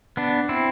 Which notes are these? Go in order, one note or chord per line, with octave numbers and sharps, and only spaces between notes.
B3 D4
C4 E4